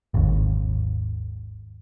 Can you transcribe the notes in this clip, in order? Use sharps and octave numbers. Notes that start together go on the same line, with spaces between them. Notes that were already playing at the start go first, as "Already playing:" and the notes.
G#1 D#2